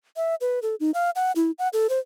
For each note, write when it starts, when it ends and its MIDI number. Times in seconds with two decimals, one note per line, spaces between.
0.16 0.35 76
0.41 0.59 71
0.62 0.75 69
0.80 0.91 63
0.94 1.10 77
1.16 1.32 78
1.36 1.51 64
1.59 1.69 78
1.73 1.87 69
1.90 1.99 72